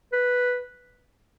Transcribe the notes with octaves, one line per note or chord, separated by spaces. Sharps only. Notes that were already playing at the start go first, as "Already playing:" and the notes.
B4